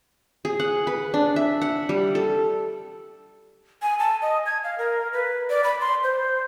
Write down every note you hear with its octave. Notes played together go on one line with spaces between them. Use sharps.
G#4
F#5
B4
D4
E5
F#5
G3
A4
G#5
A5
D#5
G#6
F5
A#4
B4
D5
B5
C6
C5